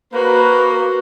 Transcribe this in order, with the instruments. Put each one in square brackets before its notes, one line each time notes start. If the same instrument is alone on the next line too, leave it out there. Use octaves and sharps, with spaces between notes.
[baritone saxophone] A#3 [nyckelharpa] F#4 C5 [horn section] B4